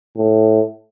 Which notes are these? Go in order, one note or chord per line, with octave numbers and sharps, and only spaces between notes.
A2